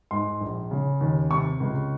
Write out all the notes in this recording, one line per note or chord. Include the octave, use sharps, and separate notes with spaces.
G#2 C6
A#1
C#3
D#2
C3 C#6
C#2